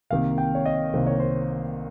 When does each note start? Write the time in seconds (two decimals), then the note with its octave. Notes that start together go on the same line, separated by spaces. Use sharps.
0.10 C2 C3 D#3 A#3 F5
0.38 G5
0.55 C#5
0.66 D#5
0.94 C2 C3 D#3 A#3 C5
1.07 C#5
1.20 C5